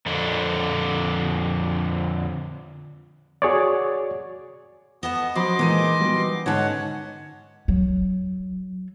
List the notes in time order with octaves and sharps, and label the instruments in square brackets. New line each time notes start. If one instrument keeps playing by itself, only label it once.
[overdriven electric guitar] F2 D3
[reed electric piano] F#4 G#4 C#5 D5
[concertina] B3 [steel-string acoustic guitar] D#5 F#5 A5
[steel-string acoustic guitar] F3 [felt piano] F#3 B5 [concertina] D#5 C6 D6
[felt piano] A#2 G#3 D#7 [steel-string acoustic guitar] E3 D#4
[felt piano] F#3 G3 B3
[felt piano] G#2 D#4 A5 [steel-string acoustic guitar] D3 C#4 [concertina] C#5 F#5
[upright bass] F#3